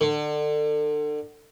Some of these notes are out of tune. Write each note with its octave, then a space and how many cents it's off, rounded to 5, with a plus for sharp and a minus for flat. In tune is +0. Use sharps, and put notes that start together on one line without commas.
D3 +30